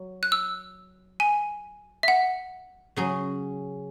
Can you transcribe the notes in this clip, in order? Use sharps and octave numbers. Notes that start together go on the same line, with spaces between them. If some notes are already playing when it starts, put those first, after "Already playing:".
Already playing: F#3
F#6
E6
G#5
E5
F#5
C#3 F#3 C#4 G#4